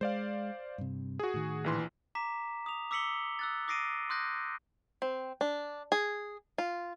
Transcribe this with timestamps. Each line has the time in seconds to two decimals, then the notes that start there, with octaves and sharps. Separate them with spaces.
0.01 G#3 C5 D5 F5
0.78 G2 C3
1.19 F#4 G#4
1.34 A2 D#3
1.64 A#1 E3 C6
2.15 A#5 D6 B6 E7
2.66 D#6 F7
2.91 D6 E6 B6 C#7 F#7 G7
3.39 E6 F#6 A6
3.68 D6 D#6 A#6 C7 D7 D#7
4.09 C6 D#6 F#6 G6 A#6
5.02 C4
5.41 D4
5.92 G#4
6.58 F4